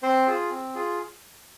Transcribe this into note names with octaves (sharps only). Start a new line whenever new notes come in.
C4 C5
F4 G#4
C4
F4 G#4